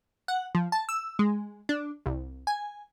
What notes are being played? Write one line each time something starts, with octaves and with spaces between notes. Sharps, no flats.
F#5
F3
A5
E6
G#3
D4
C2
G#5